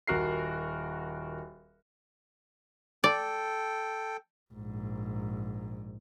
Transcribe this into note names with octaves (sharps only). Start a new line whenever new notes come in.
D#1 F#4 A#4 C7
A4 D5 G5
A#1 G#2